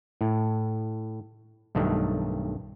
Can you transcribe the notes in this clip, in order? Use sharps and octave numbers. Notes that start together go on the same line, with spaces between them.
A2
B1 G2 D#3 A3